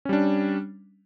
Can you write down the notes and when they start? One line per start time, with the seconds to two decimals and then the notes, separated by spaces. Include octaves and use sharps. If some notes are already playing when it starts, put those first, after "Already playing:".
0.05 C#4
0.09 G3
0.13 D4